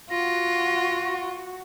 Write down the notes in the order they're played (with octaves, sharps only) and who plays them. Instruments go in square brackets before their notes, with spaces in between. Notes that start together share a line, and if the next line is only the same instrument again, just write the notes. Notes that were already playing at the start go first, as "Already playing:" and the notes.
[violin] F4 [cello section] F#4 [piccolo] A#6